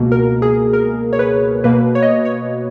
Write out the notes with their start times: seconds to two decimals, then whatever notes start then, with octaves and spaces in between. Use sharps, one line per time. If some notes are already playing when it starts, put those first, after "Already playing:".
Already playing: C#2 B2 A#3
0.12 A#4
0.42 G#4
0.73 A#4
1.13 C#5
1.19 B4
1.64 B2 A#3 B4
1.95 C#5
2.02 D#5
2.11 C#5
2.25 C#5